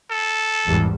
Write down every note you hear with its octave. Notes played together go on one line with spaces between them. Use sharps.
A4
G#1 E2 G3